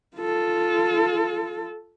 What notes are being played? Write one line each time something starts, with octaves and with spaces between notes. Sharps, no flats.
F4 A4